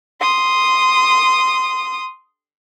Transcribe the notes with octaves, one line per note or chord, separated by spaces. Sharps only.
C6 D#6